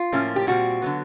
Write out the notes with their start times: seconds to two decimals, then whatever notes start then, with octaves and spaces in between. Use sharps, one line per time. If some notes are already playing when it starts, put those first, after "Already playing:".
Already playing: F4
0.12 A2 F3 A#3 C#4
0.36 G4
0.47 A#2 G3 C4 F#4
0.82 D3 F#3 B3